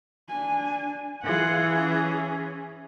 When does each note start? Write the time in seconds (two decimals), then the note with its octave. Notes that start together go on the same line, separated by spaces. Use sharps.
0.29 D4 G#5
1.24 E3 F4 G#4 F#5
1.76 C#4